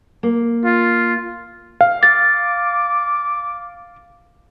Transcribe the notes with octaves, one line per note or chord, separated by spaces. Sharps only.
A#3
F4
F5
D6 A6